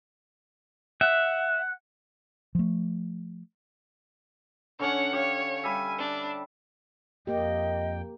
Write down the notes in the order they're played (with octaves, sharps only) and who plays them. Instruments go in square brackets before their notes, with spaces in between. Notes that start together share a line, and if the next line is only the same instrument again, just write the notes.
[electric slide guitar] E5 [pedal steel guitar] F#5
[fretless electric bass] F3 A3
[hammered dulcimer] D3 C#4 D4 [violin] C#5 F#5
[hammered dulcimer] G4 F5 [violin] C#5
[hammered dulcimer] G3 E5 [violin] G#5
[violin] D4
[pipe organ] F2 G5 [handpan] A#3 G4 [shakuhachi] D#5